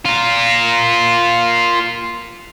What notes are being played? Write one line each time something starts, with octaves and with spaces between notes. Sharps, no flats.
F4 A#4